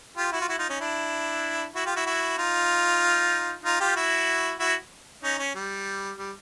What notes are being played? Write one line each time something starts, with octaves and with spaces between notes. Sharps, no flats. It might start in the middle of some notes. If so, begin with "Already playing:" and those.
F4 G4
E4 F#4
F4
E4 F#4
D#4 F4
C#4 D#4
D4 E4
E4 F#4
F4 G4
E4 F#4
E4 F#4
D#4 F4
D#4 F4
F4 G4
E4 F#4
E4 F#4
C#4 D#4
C#4
G3
G3